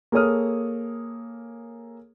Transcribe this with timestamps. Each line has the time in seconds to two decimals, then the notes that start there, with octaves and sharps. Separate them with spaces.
0.12 A#3 G#4 A4 C#5 D#6 F6